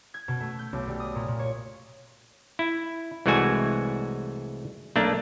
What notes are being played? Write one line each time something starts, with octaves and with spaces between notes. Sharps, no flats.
G#6
B2
A3
G6
B1
G3
D#6
A#2
A#2
C#5
E4
C2 E3 G#3 A3 F#4 G#5
B1 A3 A#3 D4